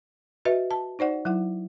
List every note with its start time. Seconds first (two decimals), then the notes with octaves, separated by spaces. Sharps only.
0.45 F#4 B4 D#5 E5
0.71 A5
0.99 D#4 C5 D5 F#5
1.25 F#3 E4 F#5